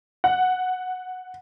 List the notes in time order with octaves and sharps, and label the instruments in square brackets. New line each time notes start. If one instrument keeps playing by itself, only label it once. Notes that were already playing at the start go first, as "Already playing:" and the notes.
[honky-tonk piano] F#5